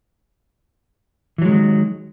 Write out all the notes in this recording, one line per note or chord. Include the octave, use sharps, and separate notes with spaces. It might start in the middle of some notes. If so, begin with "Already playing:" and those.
D#3 E3 F#3 G#3